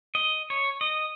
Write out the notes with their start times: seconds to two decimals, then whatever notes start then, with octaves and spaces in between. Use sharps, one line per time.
0.15 D#5
0.50 C#5
0.81 D#5